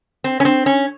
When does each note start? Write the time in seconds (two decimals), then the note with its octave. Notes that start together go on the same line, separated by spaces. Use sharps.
0.24 C4
0.40 C#4
0.45 C4
0.66 C#4